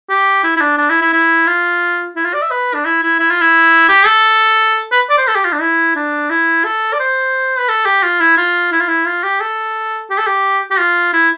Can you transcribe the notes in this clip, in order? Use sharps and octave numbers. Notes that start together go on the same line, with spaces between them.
G4
E4
E4
D4
D4
E4
E4
E4
F4
E4
F4
D5
E5
B4
D4
E4
E4
E4
F4
E4
G4
A4
B4
D5
C5
A4
G4
F4
D4
E4
D4
E4
A4
D5
C5
B4
A4
G4
F4
E4
F4
E4
F4
E4
F4
G4
A4
G4
A4
G4
G4
F4
E4